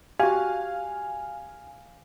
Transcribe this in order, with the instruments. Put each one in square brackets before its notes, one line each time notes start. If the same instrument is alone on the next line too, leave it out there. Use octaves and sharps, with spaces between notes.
[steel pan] F#4 G4 [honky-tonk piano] F5 [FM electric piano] G#5